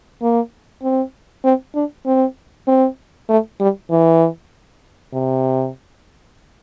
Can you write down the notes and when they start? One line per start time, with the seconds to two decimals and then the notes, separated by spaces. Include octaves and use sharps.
0.22 A#3
0.83 C4
1.44 C4
1.75 D4
2.06 C4
2.68 C4
3.29 A3
3.60 G3
3.90 E3
5.13 C3